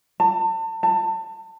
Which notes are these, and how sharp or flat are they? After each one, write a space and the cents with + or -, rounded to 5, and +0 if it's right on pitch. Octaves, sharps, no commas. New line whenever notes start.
A5 +35
A5 +30